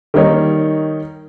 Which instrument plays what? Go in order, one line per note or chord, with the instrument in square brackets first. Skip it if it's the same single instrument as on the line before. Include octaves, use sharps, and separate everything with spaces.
[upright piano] D#3 G3 A#3 D#4 A#4 C#5